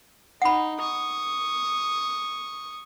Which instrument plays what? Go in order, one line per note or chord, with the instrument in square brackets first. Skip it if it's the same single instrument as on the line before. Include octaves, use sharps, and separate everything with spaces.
[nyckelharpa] D#4 [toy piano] F#5 B5
[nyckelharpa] C#6 D#6